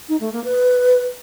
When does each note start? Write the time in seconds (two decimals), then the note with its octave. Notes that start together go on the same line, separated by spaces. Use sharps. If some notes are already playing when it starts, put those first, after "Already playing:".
0.09 D#4
0.21 A3
0.32 A#3
0.44 B4